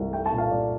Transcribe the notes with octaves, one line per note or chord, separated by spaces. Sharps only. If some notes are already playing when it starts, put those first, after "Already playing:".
Already playing: C2
A3 G5
A5
A#2
F5
A#2 D5